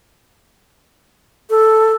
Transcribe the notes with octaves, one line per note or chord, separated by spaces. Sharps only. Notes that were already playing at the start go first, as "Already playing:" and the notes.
A4